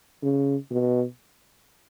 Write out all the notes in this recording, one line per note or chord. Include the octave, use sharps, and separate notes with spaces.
C#3
B2